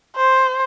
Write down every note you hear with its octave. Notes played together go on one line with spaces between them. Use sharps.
C5